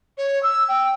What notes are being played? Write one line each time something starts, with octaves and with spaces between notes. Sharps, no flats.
C#5
E6
G5